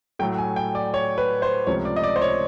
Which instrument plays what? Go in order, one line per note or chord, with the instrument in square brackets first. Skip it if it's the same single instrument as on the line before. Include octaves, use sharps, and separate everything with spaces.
[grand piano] A2 F#3 A3 G5
G#5
G5
D5
C#5
B4
C5
C#2 C3 F3 A3 C#5
D5
D#5
D5
C5
C#5